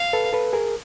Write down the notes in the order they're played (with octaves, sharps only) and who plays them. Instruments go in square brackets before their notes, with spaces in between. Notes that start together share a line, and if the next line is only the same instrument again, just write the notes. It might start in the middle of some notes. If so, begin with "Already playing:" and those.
Already playing: [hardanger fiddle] F5
[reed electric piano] A4 B4
A4 B4
G#4 A#4